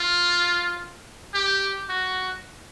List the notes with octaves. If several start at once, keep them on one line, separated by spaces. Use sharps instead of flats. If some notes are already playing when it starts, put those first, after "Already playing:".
Already playing: F4
G4
F#4